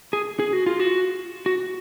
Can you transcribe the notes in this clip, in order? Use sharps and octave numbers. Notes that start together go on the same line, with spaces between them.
G#4
G#4
F#4
F4
F#4
F#4